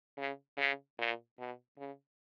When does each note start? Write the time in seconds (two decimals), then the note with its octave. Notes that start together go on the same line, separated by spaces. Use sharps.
0.18 C#3
0.58 C#3
0.99 A#2
1.39 B2
1.78 C#3